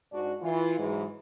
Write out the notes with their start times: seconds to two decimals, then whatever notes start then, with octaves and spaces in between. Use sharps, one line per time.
0.12 G#2 D4 F#4
0.42 E3 F4
0.78 G#2 E3 F#3 G#3